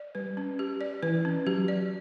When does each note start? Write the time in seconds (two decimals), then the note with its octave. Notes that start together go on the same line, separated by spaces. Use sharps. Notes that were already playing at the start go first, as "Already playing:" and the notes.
Already playing: D5
0.15 G3 B4
0.37 C#4
0.59 G4
0.81 D5
1.03 E3 B4
1.25 C#4
1.47 F#3 G4
1.68 D5